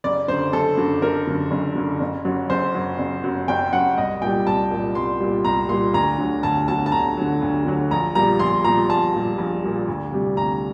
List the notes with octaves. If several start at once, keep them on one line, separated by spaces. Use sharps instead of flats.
F#1 D5
F#2 D3 C5
F#1 A4
F#2 D3
F#1 A#4
F#2 D3
F#1
F#2 D3
F#1
F#2 F#3
F#1 C5
F#2 F#3
F#1
F#2 F#3
F#1 G5
F#2 F#3 F#5
C2 D#5
A#2 G3 G5
C2 A5
A#2 G3
C2 C6
A#2 G3
C2 A#5
A#2 G3 C6
D2 A#5
D3 F#3
D2 A5
D3 F#3 A5
A5
D2 A#5
D3 F#3
D2
D3 F#3
A#1 A#5
A#2 G3 A#5
A#1 C6
A#2 G3 A#5
A#1 A5
A#2 G3
A#1
A#2 G3
D2
C3 G3
D2 A#5